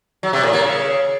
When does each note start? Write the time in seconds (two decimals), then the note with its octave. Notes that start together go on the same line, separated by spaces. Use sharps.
0.23 F#3
0.33 C3
0.43 A2
0.53 A#3
0.63 C#3